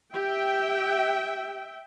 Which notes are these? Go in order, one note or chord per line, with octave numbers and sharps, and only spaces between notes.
G4 E5 G5